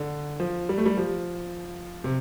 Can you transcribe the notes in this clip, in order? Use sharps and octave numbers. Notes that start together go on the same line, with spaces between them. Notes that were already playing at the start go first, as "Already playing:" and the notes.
Already playing: D3
F3
G3
A3
G3
F3
C3